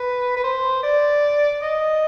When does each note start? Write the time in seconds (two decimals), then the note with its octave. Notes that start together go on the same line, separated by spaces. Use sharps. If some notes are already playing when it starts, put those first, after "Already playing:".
Already playing: B4
0.37 B4
0.44 C5
0.83 D5
1.62 D#5